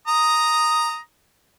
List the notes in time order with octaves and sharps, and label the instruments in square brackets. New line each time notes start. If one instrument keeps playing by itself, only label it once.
[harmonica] A#5 D#6